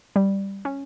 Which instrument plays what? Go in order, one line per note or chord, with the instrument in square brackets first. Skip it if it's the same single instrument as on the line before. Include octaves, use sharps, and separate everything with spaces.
[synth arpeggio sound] G3
C#4